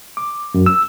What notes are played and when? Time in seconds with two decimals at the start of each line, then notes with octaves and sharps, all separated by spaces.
0.17 D6
0.54 F#2
0.66 E6